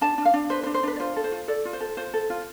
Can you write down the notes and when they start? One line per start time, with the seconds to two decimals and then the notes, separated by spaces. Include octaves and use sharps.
0.01 D4 A5
0.18 D4
0.25 F5
0.34 D4
0.50 B4 C5
0.63 C5
0.66 D4
0.74 C5
0.83 D4 B4
0.96 D5
1.00 F4 C5
1.16 A4
1.24 C5
1.32 F4
1.48 A4 D5
1.65 F4
1.73 C5
1.80 A4
1.97 F4 C5
2.14 A4
2.30 F4